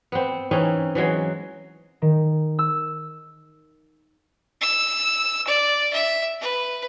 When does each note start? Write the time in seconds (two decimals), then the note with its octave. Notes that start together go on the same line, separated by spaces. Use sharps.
0.12 B3 C4
0.51 E3 C4 C#4 D#4
0.95 E3 F#3 G#3
2.02 D#3
2.59 E6
4.61 E6
5.47 D5
5.93 E5
6.41 B4